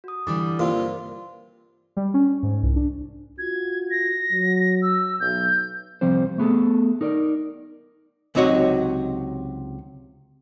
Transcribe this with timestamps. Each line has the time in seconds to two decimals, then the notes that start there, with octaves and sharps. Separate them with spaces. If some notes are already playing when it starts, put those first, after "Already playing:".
0.04 F#4 D#6
0.27 D3 E3 G3 D6 A6
0.59 G2 C3 A#3 F4 A#4 C5 D5
1.97 G3
2.14 C#4
2.43 G#2
2.63 C2
2.76 D4
3.39 F4 F#4 G#6
3.91 A#6
4.31 F#3
4.82 E6
5.20 B1 G6
6.01 C2 F3 G3 C4 C5
6.38 A3 B3 G#4 A4
7.01 D#4 A#4 D5
8.35 C#2 C3 F#3 D#4 F#4 C#5